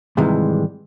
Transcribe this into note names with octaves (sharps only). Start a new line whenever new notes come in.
G#2 C3 D#3 E3 G3 G#3